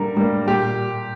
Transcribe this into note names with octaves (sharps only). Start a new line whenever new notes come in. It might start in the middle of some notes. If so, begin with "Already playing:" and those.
Already playing: D3 G3 A#3 A#4
G3 A#3
A#2 G4